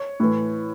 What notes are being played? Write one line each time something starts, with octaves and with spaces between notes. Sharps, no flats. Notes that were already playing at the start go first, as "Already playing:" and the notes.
Already playing: C#5
A2 E3